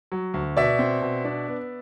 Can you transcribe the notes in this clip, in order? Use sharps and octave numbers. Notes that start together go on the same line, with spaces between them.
F#3
D2
B2 D5 E5
C4
B2
D4
B3